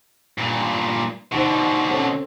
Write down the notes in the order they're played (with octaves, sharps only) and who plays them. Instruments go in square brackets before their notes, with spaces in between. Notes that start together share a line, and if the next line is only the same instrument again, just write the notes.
[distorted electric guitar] G2 A#2
[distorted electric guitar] B2 D3 [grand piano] D#4 C5
[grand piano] C4 C#4 A4